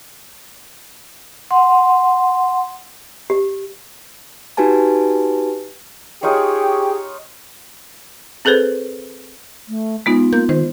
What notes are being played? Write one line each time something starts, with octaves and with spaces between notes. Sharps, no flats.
F#5 C6
G4
D#4 F#4 G4 B4 G#5 A5
D#4 F4 G4 G#4 C#5 G5
C4 G#4 A4 B4 C5
A3
G#3 B3 D#4 F4
A#3 G6
D#3 C5